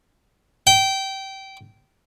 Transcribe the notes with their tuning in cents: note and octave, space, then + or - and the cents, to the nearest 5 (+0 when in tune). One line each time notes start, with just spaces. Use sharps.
G5 -20